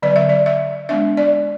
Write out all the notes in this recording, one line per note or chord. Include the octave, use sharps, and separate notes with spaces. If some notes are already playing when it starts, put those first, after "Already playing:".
D3 F#3 B3 D5
E5
D5
E5
G#3 B3 D4 E5
D5